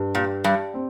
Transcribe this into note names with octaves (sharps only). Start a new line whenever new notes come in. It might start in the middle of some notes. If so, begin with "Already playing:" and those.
Already playing: G2
A#2 G4
G2 G4
C4